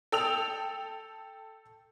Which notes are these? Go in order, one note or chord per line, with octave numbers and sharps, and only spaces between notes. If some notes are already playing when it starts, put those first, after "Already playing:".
A4 G5 E6 F7